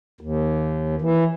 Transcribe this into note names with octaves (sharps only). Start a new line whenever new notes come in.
D#2
E3